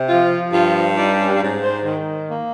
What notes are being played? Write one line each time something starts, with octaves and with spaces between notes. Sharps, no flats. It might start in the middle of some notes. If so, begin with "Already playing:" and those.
Already playing: C3
F3 F4
G2 F4
G3 D#4
C#4
G#2 C#4
C5
D#3
A#3